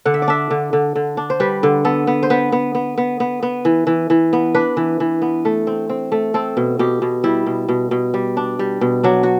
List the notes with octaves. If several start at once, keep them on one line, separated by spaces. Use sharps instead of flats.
D3 F#5
E5
D5
D4 E5
D3
D3
D3
D4
C5
G3 B4
D3
B3 A4
B3
C5
B3 B4
B3
B3
B3
B3
B3
E3
E3
E3
B3
D4 B4
E3
E3
B3
A3
C4
C4
A3
C4 A4
B2
B2 G4
B2
G3 E4
B2
B2
B2
G3
D4
G3
B2
F#3 D4
F#4